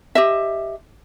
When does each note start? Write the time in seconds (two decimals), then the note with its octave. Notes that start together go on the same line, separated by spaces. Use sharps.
0.15 G4 D#5 E5